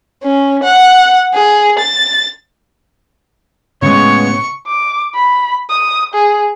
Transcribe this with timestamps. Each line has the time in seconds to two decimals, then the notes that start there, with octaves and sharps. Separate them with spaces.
0.23 C#4
0.63 F#5
1.34 G#4
1.79 A6
3.82 A2 C#3 G#3 B3 C#5 C#6
4.67 D6
5.14 B5
5.70 D#6
6.14 G#4